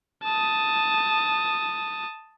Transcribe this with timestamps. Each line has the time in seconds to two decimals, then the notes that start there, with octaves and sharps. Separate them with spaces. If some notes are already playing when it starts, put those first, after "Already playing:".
0.24 A5 D#6